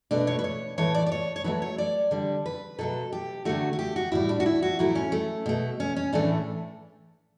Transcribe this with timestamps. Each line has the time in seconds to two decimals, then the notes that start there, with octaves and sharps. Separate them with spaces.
0.11 B2 A3 D4
0.27 C#5
0.39 B4
0.44 C#5
0.78 A2 E3 A3 C#5
0.95 D5
1.06 D5
1.12 C#5
1.36 C#5
1.44 D3 F#3 A3 B4
1.62 C#5
1.78 D5
2.11 D3 G3
2.46 B4
2.78 B2 F#3 A3 A4
3.12 G4
3.45 D3 F#3 A3 F#4
3.73 F#4
3.79 G4
3.96 F#4
4.12 A2 G3 E4
4.29 D4
4.40 F#4
4.46 E4
4.62 F#4
4.79 A2 F#3 A3 E4
4.95 C#4
5.12 A3
5.46 B2 A3
5.80 C#4
5.96 C#4
6.13 A2 E3 A3 D4